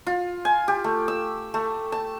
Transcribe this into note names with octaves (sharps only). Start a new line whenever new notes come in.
F4
G#5
G4
A3
E6
A3
A5